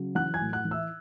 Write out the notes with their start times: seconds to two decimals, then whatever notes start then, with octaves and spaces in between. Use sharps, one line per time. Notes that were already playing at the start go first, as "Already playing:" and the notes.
Already playing: C#3 F#3
0.15 E3 F#5 F#6
0.34 G#5 G#6
0.41 A2
0.53 F#5 F#6
0.65 E3
0.71 E5 E6